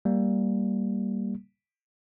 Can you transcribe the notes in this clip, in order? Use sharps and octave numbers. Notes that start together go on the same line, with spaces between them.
G3 A#3